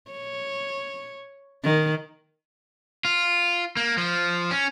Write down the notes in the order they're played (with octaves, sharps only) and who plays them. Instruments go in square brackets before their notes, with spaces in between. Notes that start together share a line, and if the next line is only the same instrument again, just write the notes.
[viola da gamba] C#5
D#3
[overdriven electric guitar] F4
A#3
F3
C#4